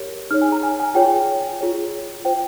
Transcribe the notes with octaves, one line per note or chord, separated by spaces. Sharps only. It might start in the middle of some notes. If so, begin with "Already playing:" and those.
Already playing: G4 A#4 C#5
D#4 G#4 C#5 F6
G#5
A#5
G#5
G#5
F4 G#4 C#5 G5
F4 G#4 C#5
F4 C5 G5